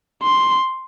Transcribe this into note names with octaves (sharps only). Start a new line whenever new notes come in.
C6